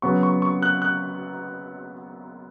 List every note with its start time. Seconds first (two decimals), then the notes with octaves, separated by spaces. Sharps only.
0.02 C#3 F#3 B3 C#6
0.23 C#6
0.42 C#6
0.62 F#6
0.82 F#6